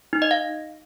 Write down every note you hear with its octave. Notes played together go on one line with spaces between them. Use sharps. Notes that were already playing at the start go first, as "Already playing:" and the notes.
D#4
D#5
F5